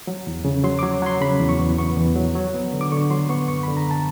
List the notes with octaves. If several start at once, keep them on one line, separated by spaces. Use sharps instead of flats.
F#3
E2
C#3
F#3 C6
F#3 D6
F#3 C6
C#3 B5
E2
C#6
E2
B3 C#6
E2
F#3
F#3
B3
D3
D6
D3 C#6
F#3 C6
B3 C#6
F#2 C#6
D3 B5
A#5
A5